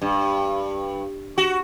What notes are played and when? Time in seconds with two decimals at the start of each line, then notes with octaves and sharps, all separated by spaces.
0.02 G2
1.38 F#4